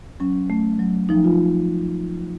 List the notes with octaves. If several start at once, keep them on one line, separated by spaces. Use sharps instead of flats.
F#3 C#4
A3
F#3
F3 D#4
F4